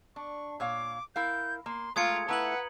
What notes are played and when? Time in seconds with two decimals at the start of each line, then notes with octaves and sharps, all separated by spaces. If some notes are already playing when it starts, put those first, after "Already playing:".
0.16 D4 C#6
0.60 A#2 C#5 F5 D6
1.16 E4 A#4 F5 G6
1.66 A#3 C6
1.96 G#3 A3 F4 A#5 D#6 G#6 C#7
2.29 A3 E4 B4 F#5 A#5 F#7